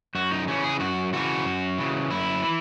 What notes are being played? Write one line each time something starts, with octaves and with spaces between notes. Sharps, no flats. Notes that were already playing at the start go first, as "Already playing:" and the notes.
F#2 F#4
D#4
C#3 E3 C#4
G#4
F#2 F#4
C#3 E3 F#4
F#2
C#3 E3
F#2 E4
E3